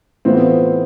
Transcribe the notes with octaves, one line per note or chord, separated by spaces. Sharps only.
A2 E3 B3 C4 F4